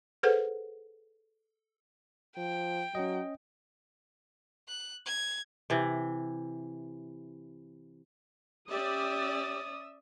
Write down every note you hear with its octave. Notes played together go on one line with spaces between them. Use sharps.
G#4 A4 B4 C5 F#5
F3 G5
F#3 C#4 D#5
F#6
G#6
C3 E3
C#4 G4 D5 E5 D#6 E6